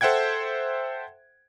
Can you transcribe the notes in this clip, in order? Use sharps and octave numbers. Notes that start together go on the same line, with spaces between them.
A4 C5 E5 F#5 G5 G#6